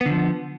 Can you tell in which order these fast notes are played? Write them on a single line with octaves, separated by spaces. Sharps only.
B3 D3 F3